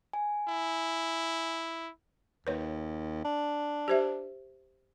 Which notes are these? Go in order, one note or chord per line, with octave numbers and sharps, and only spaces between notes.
G#5
E4
D#2 B4 C#5
D4
G4 C5 E5